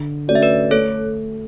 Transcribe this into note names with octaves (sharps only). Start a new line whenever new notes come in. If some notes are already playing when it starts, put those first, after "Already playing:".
Already playing: D3
A3 C#4 F#4 D5
E5
B4 D5
A3 A4 C#5